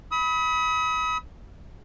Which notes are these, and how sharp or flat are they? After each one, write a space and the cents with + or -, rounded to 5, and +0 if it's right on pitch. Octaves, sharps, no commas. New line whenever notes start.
B5 +0 D#6 +40